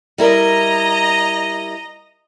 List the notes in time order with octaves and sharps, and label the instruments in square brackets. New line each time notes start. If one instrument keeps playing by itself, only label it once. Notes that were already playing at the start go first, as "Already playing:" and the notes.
[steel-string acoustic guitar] G3 E4 A#4 [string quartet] D#5 A#5